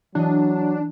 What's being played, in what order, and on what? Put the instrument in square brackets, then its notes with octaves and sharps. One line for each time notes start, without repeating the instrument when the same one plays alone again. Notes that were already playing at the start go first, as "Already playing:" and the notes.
[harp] E3 D#5 [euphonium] F#3 [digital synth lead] D4